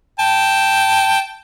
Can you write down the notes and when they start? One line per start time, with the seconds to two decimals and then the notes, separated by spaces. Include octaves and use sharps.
0.20 G5 A5